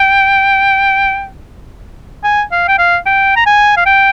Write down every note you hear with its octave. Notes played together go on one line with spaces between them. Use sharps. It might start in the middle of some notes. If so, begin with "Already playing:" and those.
Already playing: G5
G#5
F5
G5
F5
G5
A#5
G#5
F5
G5